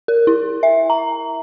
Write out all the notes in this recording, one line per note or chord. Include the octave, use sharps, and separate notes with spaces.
A#4
E4
E5
A#5